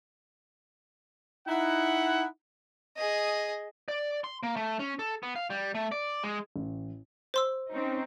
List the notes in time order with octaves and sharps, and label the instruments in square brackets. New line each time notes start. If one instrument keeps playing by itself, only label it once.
[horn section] D#4 E4 F#5
[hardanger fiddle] G#4 D#5
[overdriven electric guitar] D5
C6
A#3
A3
C#4
A4
B3
F5
G3
A3
D5
G#3
[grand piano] A1
[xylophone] C5 C6 E6
[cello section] C4 C#4 D#4